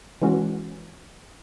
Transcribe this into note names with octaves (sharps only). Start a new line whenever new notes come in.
E3 G#3 C#4 F#4